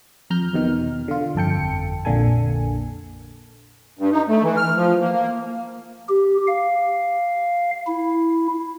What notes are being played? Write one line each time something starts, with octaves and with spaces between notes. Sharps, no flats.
F2 A#5 F6 G6
E2 B2 D#3 F6
D3 F4
G1 F2 A4 G5 C#7
A#1 F2 D3 A#3 A4 G#5
G2
D#4
A3
E3
F6
F3
A#3
A#3
G4
F5
E4